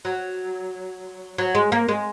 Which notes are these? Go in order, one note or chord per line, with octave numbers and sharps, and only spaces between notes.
F#3
F#3
G#3
A#3
G#3